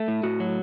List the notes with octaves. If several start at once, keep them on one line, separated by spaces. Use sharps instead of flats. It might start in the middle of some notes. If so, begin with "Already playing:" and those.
Already playing: A3
A2
A2 F#4
F#3